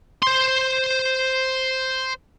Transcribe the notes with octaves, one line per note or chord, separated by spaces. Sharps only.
C5 C6